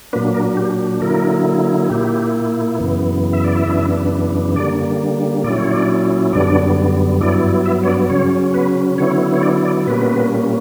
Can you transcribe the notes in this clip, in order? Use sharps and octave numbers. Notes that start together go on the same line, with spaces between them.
A#2 F#3 A#3 B3 D4 B4
A#3 A#4
G4
D3 F#3 A#3 E4 A#4
A#2 A#3 E4 G4
F#2 C#3 E3 B3
E5
D5
E4 E5
F#2 C#3 E3 B3 D4
D3 G3 A#3 D4 D5
A#2 F#3 C#4 E4 D5
C#5
D4 D5
F#2 D3 G3 B3 D4 D5
G2 F#3 B3 D4 E4 D5
E4 E5
C#5
D4 D5
C#3 F#3 C#4 C#5
B3 B4
D3 F#3 B3 C#4 E4 C#5
C#5
D4 D5
D4 D5
A#2 G3 A#3 B3 C#4 B4